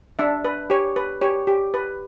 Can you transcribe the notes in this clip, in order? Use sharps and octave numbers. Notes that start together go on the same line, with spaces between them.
D4 E5
B4
G4 C#5
B4
G4 C#5
G4
B4